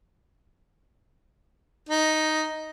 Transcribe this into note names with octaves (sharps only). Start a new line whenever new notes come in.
D#4